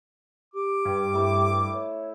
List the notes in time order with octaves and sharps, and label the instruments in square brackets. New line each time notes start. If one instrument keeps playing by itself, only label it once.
[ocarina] G4 [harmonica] D6
[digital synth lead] G2
[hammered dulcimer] A3 E4 C5
[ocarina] C#5